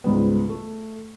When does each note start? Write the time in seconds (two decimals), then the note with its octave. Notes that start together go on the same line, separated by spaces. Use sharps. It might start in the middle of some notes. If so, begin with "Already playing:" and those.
0.04 C#2 G#2 G3 B3
0.49 A3